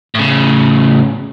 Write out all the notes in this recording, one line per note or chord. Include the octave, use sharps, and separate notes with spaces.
A2 C#3